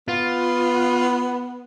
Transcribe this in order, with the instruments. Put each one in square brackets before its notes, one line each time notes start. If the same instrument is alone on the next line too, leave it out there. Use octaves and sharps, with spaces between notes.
[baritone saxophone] B3 [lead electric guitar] F4